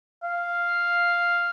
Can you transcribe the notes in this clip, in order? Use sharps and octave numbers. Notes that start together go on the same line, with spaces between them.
F5